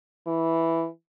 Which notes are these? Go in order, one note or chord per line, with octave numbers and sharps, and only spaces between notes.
E3